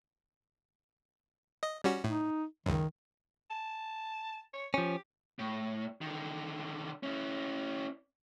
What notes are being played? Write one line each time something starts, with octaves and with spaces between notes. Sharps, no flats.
D#5
G3 C#4 F#4
A2 D#4
C#2 F#2 D#3
A5
C#5
F3 C#4 G4
A2
D3 D#3
C#4 E4